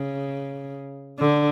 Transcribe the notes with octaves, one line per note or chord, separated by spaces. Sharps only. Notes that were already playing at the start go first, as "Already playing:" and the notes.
Already playing: C#3
D3